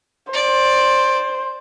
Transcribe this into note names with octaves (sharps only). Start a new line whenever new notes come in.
C5 D5